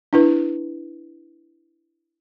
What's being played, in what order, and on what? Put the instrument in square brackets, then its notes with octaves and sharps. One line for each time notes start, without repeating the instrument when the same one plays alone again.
[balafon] D4 E4 B4